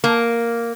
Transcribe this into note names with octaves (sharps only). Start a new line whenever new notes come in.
A#3